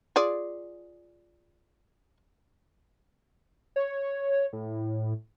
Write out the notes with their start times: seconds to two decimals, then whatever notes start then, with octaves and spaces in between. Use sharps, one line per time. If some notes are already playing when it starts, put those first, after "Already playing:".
0.16 F4 G#4 D5
3.76 C#5
4.53 A2